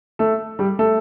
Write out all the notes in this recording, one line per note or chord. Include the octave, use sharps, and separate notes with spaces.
A3 A4
G3 G4
A3 A4